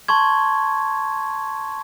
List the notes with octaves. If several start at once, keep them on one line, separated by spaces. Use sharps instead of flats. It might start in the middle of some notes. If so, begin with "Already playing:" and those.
A5 C6 C#6 G#6